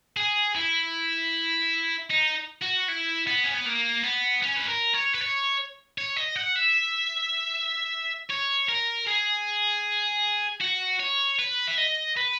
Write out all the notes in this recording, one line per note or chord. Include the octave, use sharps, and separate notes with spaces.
G#4
E4
D#4
F#4
E4
B3
C#4
B3
A#3
B3
C#4
B4
A#4
C#5
B4
C#5
C#5
D#5
F#5
E5
C#5
A#4
G#4
F#4
C#5
B4
E5
D#5
B4